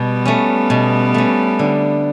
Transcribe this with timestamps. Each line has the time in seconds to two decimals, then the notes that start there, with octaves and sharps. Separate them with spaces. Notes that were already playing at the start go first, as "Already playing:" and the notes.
Already playing: B2 G3 B3
0.25 A3 C#4
0.70 B2
1.14 A3 C#4
1.59 D3